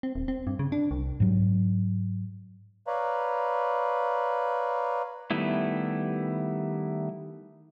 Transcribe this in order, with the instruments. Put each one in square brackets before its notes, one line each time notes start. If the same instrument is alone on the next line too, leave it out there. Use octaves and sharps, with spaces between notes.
[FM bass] C4
D#1
C4
G2
C#3
D4
C2
[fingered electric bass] G#2 F#3
[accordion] B4 C#5 D5 F5 A#5 B5
[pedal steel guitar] D#3 G3 A3 B3 E4